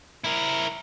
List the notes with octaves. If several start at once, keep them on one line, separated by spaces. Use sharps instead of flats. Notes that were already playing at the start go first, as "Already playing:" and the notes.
E4 A#4